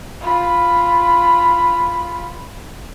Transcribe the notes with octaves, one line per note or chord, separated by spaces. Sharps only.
F4 B5